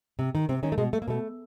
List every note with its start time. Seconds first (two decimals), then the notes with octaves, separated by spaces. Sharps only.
0.19 C3
0.35 D#3
0.49 C3 C4
0.63 D#3 C#4
0.72 A3
0.78 B2 G#3
0.93 A3
1.02 A#3
1.08 B2 A3